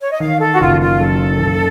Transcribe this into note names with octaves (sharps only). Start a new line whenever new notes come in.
C#5
D#5
D#3 F5
A4
F#4
F#1 F4
F4
F#2 A4
F#1